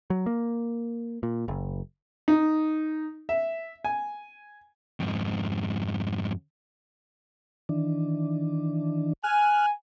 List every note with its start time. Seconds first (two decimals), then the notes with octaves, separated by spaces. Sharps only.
0.10 F#3
0.26 A#3
1.23 A#2
1.48 F#1
2.28 D#4
3.29 E5
3.85 G#5
5.00 F2 G#2
7.69 D#3 E3 D4
9.23 G#5 F6 F#6